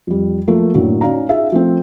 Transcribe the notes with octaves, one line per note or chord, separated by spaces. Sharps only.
F2 G3
F3 F#3 A3 A#3 A#4
F#2 A2 D3 F#3 A#3
C#4 D#4 F#4 D5 F5 A#5
D#4 F4 G#4 E5 F5
F3 A3 C4